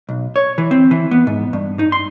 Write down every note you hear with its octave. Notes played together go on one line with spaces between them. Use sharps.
B1
C#5
E3
C4
E3
B3
G#2
G2
D#4
C6